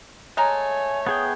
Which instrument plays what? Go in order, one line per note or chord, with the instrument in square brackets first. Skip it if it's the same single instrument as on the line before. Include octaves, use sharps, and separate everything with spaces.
[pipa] G#3 A3 A#5 [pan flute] C#5 [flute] G#5
[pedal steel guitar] B3 G#4 G5 [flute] D#6